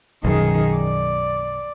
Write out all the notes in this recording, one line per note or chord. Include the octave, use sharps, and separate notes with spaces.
B1 F#2 D#3 G#4
D5